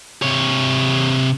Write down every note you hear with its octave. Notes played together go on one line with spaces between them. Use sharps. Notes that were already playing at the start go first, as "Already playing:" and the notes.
C3 C#5